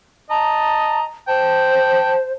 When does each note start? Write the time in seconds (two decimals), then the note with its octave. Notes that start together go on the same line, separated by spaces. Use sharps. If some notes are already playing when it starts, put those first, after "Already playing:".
0.30 D#5 A5 A#5
1.28 C5 G5 A5